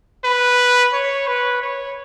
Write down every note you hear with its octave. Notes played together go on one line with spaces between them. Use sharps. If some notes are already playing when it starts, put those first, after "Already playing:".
B4
C#5
B4
C#5